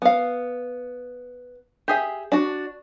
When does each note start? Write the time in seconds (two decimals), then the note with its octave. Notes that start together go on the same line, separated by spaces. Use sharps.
0.02 B3 F5
1.88 G4 G#4 E5
2.32 D4 F#4